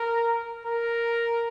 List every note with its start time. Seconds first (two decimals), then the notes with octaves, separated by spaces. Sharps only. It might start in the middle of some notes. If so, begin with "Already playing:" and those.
Already playing: A#4
0.66 A#4